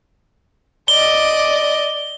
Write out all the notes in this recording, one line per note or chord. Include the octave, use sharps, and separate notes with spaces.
D5 D#5 G7